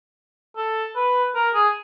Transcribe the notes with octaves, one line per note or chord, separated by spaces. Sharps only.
A4
B4
A#4
G#4